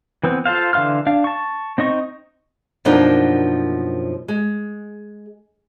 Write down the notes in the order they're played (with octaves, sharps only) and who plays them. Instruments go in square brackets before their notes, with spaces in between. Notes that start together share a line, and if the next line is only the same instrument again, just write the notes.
[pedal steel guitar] E3 B3 C4
F4 A4 C5 F5
D3 E3 F5 C6 F6
D4 F5
A5 C#6
C4 D#4 D#5 C#6
[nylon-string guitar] F#2 B2 F3 A#3 D4 D#4
G#3